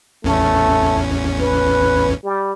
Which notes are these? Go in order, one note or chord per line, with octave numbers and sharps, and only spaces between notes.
A1 E2 A3 C#4
B4
G3